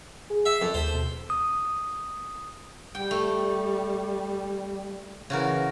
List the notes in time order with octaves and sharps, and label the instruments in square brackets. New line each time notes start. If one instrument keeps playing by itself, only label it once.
[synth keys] G#4
[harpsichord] E5 [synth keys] C7
[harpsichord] F2
[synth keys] D#2 A4 [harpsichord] C5
[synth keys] D#2 B2
[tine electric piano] D#6
[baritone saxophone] G3 [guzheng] G5
[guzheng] A3
[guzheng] C#3 F#4 A#4 [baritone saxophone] E3